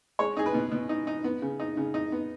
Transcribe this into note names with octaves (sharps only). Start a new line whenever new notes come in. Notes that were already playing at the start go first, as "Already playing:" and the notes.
G#3 C#5
D#4 G#4
B4
B2
B2
D#4
D#4
B3
C#3
D#4
C#3
D#4
B3